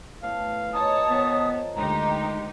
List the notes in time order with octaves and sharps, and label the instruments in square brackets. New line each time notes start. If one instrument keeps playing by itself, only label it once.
[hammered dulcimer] A2 B3 A4 [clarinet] F5
[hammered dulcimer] D#4 F4 G#4 [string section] C#5 A5 [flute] D#6
[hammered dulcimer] D#3 F3 [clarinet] B3
[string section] D2 D#4 G4 [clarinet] G#3 [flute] A#5